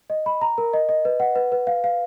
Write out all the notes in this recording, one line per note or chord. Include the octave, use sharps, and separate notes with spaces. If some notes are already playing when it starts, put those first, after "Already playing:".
D#5
B5
A#5
A#4
D#5
D#5
B4
F#5
B4
B4
F5
F5